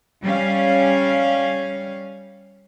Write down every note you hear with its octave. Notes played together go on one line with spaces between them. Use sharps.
G3 C#4 F5